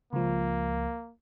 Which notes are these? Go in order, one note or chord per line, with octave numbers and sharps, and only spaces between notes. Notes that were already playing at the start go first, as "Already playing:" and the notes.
C#2 F3 A#3